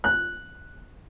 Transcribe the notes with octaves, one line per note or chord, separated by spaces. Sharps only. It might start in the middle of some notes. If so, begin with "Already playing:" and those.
F#6